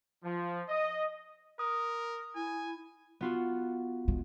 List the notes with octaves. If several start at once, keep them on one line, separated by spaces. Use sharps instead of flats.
F3
D#5
A#4 D#6
E4 G#5
B3 F4 F#4
G#3